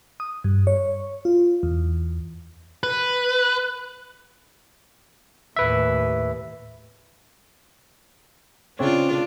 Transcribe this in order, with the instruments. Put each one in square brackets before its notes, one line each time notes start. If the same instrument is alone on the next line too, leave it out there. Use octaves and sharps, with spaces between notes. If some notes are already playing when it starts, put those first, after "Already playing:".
[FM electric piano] D#6
G2
C#5
F4
E2
[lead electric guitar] B4
[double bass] D#2 A2 [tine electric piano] B4 E5
[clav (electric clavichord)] C#3 C4 C#5 [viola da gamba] D4 F4